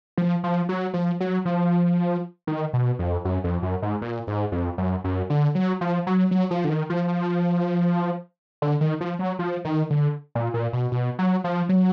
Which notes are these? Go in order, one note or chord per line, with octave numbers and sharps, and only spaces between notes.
F3
F3
F#3
F3
F#3
F3
D#3
B2
F2
F#2
F2
F#2
G#2
A#2
G#2
F2
F#2
F#2
D3
F#3
F3
F#3
F#3
F3
D3
D#3
F3
D3
D#3
F3
F#3
F3
D#3
D3
A#2
A#2
B2
B2
F#3
F3
F#3